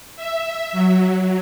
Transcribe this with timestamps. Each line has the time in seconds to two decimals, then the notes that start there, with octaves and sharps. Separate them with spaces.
0.16 E5
0.72 F#3